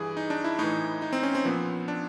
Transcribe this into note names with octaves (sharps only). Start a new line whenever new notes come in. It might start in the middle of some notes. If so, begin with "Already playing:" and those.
Already playing: G2 E3 G#4
D#4
D4
E4
A2 E3 D#4
D#4
C4
C#4
C4
A#2 F3 B3
D4